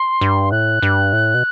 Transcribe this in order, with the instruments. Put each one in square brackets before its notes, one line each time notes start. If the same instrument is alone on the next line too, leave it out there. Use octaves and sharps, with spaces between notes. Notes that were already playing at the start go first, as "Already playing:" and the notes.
Already playing: [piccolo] C6
[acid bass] G2
[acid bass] A2 [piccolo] F#6
[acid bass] G2
A2
B2